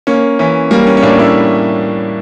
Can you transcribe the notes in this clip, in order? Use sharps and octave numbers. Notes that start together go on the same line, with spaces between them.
A#3 C#4
E3 C#4
G3 A#3
C#4
C#4
A2 A#3 D4
C#4 E4